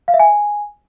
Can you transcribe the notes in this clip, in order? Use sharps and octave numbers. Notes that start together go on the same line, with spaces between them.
F5
E5
G#5